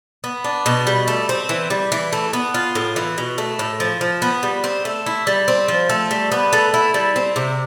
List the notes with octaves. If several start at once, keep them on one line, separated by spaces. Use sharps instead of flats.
B3
D4
B2
G3
A3
C4
E3
G3
E3
A3
B3
F4
A2
E3
B2
A3
A2
F3
F3
B3
G3
C4
A3
E4
G3
C4
F3
A3
G3
B3
A3
E4
G3
C4
C3